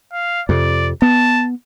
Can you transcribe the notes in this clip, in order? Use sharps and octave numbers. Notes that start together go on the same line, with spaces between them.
F5
F2 C3 D5
B3 A5